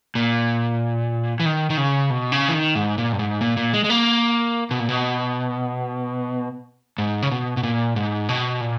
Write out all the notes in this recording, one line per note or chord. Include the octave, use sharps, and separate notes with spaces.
A#2
E3
D#3
D#3
C#3
B2
C#3
E3
D#3
G#2
A#2
G2
G#2
A#2
A#2
G#3
G#3
A#3
B2
A#2
B2
G#2
C#3
B2
B2
A#2
G#2
B2
A#2